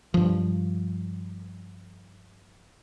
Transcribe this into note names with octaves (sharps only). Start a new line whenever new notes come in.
G2 F3